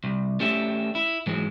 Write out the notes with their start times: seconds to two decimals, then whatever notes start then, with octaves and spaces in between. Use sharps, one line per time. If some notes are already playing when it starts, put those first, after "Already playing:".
0.04 C2
0.40 A3 C#4 G4 D5 E5
0.95 E4
1.27 G#2 E3 F#3 G#3